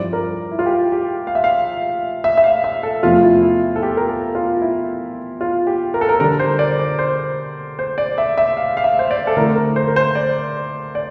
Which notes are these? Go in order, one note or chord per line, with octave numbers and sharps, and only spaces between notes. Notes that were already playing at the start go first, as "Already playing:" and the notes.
Already playing: G2 F3 C4 E4 D5
A#4
E4
F4
G4
G4
F5
E5
F5
E5
E5
F5
E5
A4
E2 C3 F3 A3 F4
E4
E4
A4
G4
A#4
A4
F4
E4
F4
G4
A#4
A4
A#4
D3 G3 D4 A#4
C5
D5
C5
C5
C5
D5
E5
E5
F5
F5
E5
C5
D5
A4
D3 A3 C4 E4 A#4
A#4
C5
A#4
C5
D5
D5